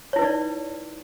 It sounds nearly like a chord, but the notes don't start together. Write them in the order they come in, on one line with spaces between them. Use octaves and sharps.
C#5 E4 B4 D#4 D5